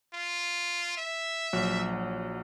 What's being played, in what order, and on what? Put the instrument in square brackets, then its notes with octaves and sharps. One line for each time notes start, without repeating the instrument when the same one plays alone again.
[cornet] F4
E5
[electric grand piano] A#1 F#3